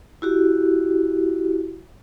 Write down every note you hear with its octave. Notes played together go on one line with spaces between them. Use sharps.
E4 F#4 G4